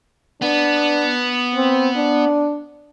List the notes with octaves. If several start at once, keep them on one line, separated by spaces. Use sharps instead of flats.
B3 D4
C4
D4